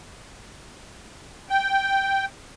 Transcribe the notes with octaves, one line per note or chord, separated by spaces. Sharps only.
G5